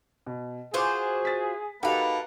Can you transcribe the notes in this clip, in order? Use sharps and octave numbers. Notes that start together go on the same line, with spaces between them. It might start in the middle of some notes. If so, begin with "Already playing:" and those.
B2
F4 F#4 G#4 C5 G#5 D6
A6 B6
A#3 D#4 F#4 G4 A4 B4 F5